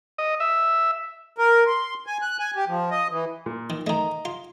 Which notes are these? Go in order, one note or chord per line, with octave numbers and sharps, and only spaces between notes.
D#5
E5
A#4
C6
G#5
F#6
G#5
G4
F3
D#5
E3
A#2
D#3
D#3 A3 D#5 A#5
F4